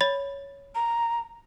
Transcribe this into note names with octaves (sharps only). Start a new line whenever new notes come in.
C#5 B5 A6
A#5